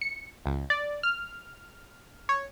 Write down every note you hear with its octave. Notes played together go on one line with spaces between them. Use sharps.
C#7
C#2
D5
F6
C#5